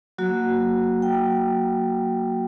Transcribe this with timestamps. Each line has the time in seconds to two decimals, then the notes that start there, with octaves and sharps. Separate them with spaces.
0.18 F#3 A#3 F#4
1.02 G5